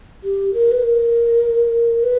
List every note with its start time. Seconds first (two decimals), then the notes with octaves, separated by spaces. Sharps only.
0.23 G4
0.54 A#4
0.71 B4
0.83 A#4
2.04 B4